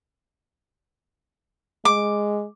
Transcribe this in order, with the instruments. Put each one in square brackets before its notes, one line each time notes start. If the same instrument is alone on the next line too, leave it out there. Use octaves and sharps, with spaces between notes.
[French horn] G#3 [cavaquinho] D6